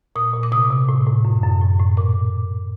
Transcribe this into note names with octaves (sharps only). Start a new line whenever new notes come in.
A#2 D#6
A#2
D6
C3 D#6
C3
A2
A2
F#2
F#2
A2
A2
A#2 D6